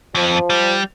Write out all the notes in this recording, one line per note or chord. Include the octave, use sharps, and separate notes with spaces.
F2 F3
G3